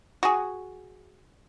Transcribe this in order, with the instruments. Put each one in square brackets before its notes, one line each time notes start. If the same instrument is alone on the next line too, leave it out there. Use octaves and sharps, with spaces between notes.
[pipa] F#4 G#4